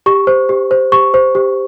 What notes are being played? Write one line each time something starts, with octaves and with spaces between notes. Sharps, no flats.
G4 C#6
C5
G4
C5
G4 C#6
C5
G4